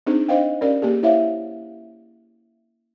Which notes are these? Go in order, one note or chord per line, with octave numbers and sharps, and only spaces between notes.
C4 D4 D#4 G#4 C5
D4 C5 D#5 F5 G5
C#4 G4 A#4 D5 F5
A#3 G4 G#4
E4 C5 C#5 E5 F5